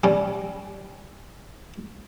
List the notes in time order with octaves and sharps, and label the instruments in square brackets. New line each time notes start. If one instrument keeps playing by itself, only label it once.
[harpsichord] G3 C#4